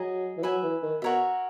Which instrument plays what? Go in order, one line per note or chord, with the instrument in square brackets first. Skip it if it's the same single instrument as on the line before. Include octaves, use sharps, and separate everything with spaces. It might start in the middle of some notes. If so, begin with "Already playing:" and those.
Already playing: [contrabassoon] F#3 [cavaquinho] G#4 D#5 A#5
[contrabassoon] E3
[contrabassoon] F#3 [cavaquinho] B4 E5 G#5
[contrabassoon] E3
D#3
[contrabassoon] B2 [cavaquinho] F#4 A#4 C#5 E5